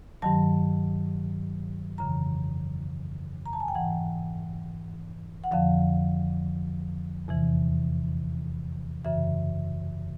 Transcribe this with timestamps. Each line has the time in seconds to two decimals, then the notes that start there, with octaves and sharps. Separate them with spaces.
0.22 G2 D#3 F#3 A5
1.98 F2 C#3 E3 A#5
3.46 A#5
3.53 A5
3.60 G#5
3.68 G5
3.75 G#2 E3 F#5
5.44 F#5
5.51 F2 D3 F3 F5
7.28 E2 C3 E3
9.05 F#2 C#3 E3 E5